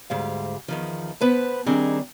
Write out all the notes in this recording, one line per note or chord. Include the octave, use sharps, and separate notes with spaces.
D2 G#2 G3 F5
E2 D#3 F3
B3 B4 C5 A5
D#3 G3 C4 D4 D#4 G#4